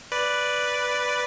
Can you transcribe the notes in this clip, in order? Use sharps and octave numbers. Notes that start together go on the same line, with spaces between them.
B4 D5